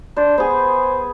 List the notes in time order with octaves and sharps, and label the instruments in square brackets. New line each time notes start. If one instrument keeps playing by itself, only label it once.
[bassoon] D4 [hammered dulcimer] C5
[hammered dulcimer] B3 G#4 [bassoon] C5